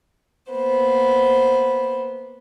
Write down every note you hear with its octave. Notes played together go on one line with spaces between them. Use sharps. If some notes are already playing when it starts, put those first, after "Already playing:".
A#3 B3 C5